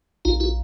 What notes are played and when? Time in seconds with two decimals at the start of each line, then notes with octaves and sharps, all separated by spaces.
0.25 A#1 D#4 F4
0.40 E4 F#4